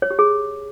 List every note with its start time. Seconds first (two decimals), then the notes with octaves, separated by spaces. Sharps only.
0.02 C#5
0.10 G4
0.19 G#4